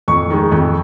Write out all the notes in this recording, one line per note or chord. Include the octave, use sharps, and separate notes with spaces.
F2 C#6
D#3 G#3
F2